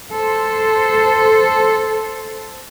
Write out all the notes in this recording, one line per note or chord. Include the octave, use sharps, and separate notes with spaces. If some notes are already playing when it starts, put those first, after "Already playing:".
A4 C5